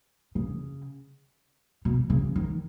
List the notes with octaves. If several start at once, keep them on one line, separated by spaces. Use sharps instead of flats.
C#3
B2
C#3
D#3